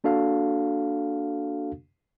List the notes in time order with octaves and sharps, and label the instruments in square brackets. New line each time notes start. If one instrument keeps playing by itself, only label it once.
[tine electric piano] A#3 D4 F#4 A4 F5